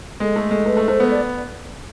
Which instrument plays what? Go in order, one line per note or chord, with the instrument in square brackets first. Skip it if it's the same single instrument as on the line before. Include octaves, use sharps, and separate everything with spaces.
[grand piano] G#3 [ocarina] A4
[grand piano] A3
G#3
[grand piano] A3 [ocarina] B4
[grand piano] A3
[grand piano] A3 [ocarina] C5
[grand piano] B3
[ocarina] D5